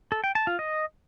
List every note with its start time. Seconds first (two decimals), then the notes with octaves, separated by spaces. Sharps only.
0.12 A4
0.24 G5
0.35 A5
0.47 F4
0.59 D#5